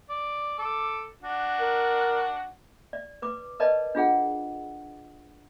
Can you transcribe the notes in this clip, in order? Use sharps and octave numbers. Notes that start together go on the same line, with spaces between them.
D5
A4 D6
D4 F#4
A#4
D5
B4 D6
A#4 B4 D5 D#5 A5
D4 F4 G#4 F#5